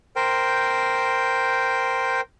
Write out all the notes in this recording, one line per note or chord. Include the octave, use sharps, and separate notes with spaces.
A#4 C5 G5